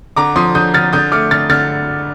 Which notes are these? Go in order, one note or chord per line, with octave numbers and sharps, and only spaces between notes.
D3 A#5 D6
F3 C6 D#6
D3 D#6 G6
D3 F6 A6
D3 D#6 G6
A3 D6 F6
D3 F6 A6
D3 F6 A6